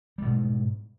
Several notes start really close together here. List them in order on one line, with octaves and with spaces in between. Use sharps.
G3 B2 G#2